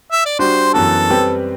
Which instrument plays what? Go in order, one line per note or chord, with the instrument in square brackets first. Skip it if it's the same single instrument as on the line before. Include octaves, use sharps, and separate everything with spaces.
[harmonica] E5
D5
[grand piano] G3 D4 F#4 [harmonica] C5
[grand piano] F#2 E3 B3 F#4 [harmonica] A4
[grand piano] G3 C4 G4 B4